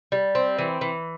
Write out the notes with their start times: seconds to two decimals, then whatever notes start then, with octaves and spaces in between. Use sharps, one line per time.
0.12 G3
0.35 C4
0.58 E3
0.81 E3